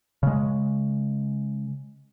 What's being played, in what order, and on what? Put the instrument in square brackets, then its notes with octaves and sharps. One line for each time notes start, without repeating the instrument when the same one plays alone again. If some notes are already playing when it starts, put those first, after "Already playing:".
[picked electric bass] C#3 G#3